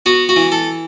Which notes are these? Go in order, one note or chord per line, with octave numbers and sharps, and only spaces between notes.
B3 F#4
F#4
E3
A4